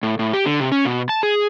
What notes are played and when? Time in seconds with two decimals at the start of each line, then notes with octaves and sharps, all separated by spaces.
0.03 A2
0.19 A2
0.33 G4
0.46 D3
0.60 C3
0.72 C#4
0.85 B2
1.09 A5
1.23 G#4